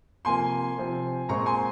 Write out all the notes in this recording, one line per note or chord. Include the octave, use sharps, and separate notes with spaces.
C3 F3 A#3 G#5 C6
C3 F3 C4
A#2 G#3 C4 A#5 C#6
G#5 C6